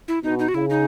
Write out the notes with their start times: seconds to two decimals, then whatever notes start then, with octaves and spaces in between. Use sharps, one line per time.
0.08 E4
0.24 B2 D#4
0.39 D#4
0.48 F#4
0.54 C#3 E4
0.70 D#4